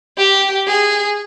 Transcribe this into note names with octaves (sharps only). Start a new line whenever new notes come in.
G4
G#4